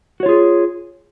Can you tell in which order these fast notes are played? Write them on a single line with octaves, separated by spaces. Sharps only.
F#4 C#5 F4 G#4